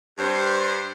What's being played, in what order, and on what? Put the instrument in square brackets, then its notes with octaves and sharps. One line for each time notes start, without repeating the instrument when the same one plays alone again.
[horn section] G2 C5